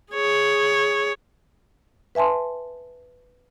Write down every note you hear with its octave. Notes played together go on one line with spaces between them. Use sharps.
G#4 C#5
B4 E5 G#5 A5 C6